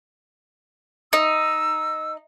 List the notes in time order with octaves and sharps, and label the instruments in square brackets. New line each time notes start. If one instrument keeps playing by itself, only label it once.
[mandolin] D#4 [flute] E6